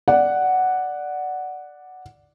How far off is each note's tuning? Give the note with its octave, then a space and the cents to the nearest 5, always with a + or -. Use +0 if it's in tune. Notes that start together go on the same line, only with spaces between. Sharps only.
D5 +0 F#5 +0